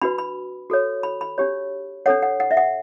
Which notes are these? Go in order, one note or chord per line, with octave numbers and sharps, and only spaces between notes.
D4 F#4 B4 B5
B5
F#4 A4 C#5
B5
B5
D4 G4 C#5
D4 A4 C#5 F#5
F#5
F#5
E5
F#5